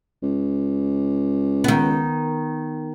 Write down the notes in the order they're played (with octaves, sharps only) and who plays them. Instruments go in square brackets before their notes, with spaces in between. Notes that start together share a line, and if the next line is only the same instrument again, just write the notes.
[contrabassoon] C#2
[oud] D#3 B3